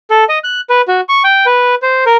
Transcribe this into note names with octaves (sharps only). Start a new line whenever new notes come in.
A4
D#5
F#6
B4
F#4
C#6
G5
B4
C5
A#4